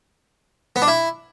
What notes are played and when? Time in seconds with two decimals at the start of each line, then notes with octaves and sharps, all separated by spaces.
0.76 B3
0.82 D4
0.88 E4